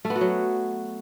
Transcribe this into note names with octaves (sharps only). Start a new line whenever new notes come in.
A3
B3
F#4
F#3